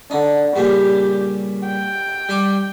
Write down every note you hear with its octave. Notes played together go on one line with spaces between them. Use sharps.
D3 D#4
G2 A#2 C#3 G4
G5
G3 C6 D6